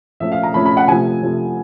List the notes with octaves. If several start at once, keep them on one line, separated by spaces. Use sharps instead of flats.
A#2 F3 A3 C#4 E5
F5
A#5
A#2 F3 A3 C#4 B5
B5
F#5
C3 F3 A3 G#5
C3 F3 A3